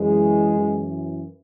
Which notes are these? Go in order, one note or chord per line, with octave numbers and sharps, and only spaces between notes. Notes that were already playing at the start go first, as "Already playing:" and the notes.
Already playing: F#2 E3 G#3
F#2 E3